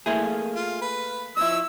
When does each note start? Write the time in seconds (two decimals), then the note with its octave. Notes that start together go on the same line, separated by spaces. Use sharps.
0.06 A3 A#3 E4 G#4 C5 C6
0.23 F5
0.55 F4
0.82 B4
1.37 F3 E4 C#5 D#5 E6